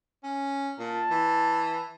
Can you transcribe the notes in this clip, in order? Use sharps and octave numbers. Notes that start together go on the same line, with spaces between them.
C#4
A#2 A5
E3